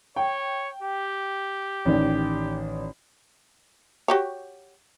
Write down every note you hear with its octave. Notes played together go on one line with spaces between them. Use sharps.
C#5 G5
G4
A1 D#3 D5
F#4 G4 C#5